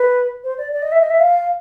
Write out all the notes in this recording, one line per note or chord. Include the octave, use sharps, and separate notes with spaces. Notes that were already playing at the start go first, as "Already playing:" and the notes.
Already playing: B4
C5
D5
D5
D#5
E5
D#5
E5
F5